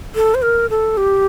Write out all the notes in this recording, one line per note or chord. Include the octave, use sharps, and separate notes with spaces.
A4
C5
A#4
A4
G4